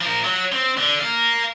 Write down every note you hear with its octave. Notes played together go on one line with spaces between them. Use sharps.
F3 A#4
F#3
C4
D3
A#4 F5